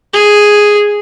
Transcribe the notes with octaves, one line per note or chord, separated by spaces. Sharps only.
G#4